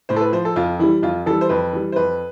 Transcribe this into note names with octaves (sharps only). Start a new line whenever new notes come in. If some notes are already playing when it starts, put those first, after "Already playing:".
A2 C5
A4
B4
F3 C5
A4
F2 F4
E3 G3 E4
F2 F4
E3 G3 A4
C5
F2 B4
E3 G3
C5
F2 B4